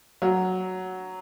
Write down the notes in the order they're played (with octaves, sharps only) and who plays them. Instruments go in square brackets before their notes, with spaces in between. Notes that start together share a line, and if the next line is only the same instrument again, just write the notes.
[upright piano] F#3